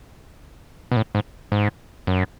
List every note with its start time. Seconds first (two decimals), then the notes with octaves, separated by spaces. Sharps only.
0.92 B2
0.96 A2
1.15 G#2
1.52 G#2
2.07 F#2